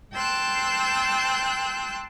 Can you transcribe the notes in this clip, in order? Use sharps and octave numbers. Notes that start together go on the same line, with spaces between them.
G5 A5 C6 E6 F#6 G6